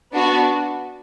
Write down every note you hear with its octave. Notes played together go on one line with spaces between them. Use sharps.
B3 D4 F#4